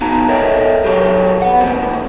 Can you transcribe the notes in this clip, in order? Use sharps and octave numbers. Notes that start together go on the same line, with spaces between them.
B3 D#4 F#4 F5 A5 A#5
A4 A#4 C#5 D#5 E5 G5
F#3 G4 A4 A#4 C#5
B3 F#5
D#3 F3 F#3 A#3 C4